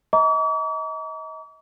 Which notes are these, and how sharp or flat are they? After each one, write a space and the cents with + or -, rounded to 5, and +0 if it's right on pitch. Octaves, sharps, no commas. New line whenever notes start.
D#5 +35 A#5 +0 D6 -45